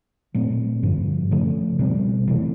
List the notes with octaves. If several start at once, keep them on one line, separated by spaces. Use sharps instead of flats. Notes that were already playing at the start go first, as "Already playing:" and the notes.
A#2 F#3 A3 C4
G2 D3 F3
C#3 F3 A3
B2 G3 C4
C3 E3 A3